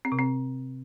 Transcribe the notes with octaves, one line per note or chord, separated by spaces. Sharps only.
C4
C3
C4